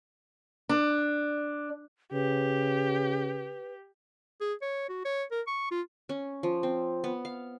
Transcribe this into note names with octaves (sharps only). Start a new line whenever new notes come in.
D4
C#3 G4 B4
G#4
C#5
F#4
C#5
A#4
C#6
F4
C#4
F3
C4
B3
F5